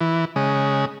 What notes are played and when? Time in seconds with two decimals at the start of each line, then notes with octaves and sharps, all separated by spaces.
0.01 E3
0.36 C#3 G#3